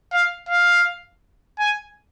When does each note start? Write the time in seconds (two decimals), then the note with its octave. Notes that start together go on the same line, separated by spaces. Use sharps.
0.12 F5
0.49 F5
1.59 G#5